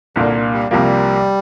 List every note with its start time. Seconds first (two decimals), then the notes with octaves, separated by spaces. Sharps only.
0.16 C2 A#2 D3 A#3 D4
0.53 G3
0.71 C2 C3 F3 G3 A#3